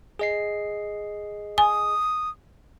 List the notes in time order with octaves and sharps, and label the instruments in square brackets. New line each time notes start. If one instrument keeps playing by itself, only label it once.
[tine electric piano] G#4 D#5 C7
[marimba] G#5 [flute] D#6